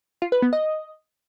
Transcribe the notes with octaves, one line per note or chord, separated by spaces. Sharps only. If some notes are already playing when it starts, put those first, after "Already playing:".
F4
B4
B3
D#5